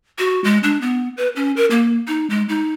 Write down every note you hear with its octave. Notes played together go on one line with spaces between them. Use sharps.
F#4
G#3
D4
B3
B4
C#4
A#4
A#3
D#4
G#3
D#4